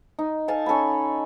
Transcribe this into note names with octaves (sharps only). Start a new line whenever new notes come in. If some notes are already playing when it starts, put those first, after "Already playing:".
D#4
A4 F5 G#5 A5
C#4 A4 G#5 B5